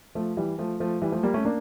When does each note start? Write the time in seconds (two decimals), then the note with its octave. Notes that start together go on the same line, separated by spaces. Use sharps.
0.15 F3 A3
0.37 E3 G3
0.58 F3 A3
0.80 F3 A3
1.02 E3 G3
1.12 F3 A3
1.23 G3 A#3
1.34 A3 C#4
1.45 A#3 D4